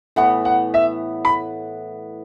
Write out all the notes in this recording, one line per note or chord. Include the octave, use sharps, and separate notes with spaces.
A2 E3 B3 F#5
F#5
E5
B5